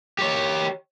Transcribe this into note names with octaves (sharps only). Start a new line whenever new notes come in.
G4 C#5